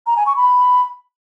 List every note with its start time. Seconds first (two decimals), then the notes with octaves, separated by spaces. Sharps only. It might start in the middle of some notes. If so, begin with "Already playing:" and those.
0.07 A#5
0.17 G#5
0.26 C#6
0.36 B5